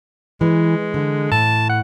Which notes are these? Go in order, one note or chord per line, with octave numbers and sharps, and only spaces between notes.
E3 G#3
D3
A2 A5
F#5